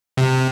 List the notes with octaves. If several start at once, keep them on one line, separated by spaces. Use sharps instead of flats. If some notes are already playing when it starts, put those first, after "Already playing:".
C3